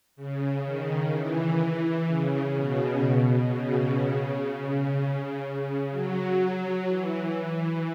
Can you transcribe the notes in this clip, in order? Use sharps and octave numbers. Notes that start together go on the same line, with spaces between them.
C#3
D#3
E3
C#3
B2
C#3
C#3
C#3
C#3
C#3
F#3
E3